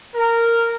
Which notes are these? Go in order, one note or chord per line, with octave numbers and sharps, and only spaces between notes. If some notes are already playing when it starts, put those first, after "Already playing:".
A#4